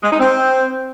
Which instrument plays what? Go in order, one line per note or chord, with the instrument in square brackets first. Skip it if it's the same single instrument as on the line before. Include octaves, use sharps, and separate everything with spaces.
[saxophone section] G#3
D#4
C4